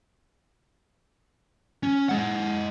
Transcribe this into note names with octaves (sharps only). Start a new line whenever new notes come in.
C#4
G#3 F#5